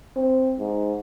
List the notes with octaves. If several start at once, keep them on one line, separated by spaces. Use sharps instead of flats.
C4
G#2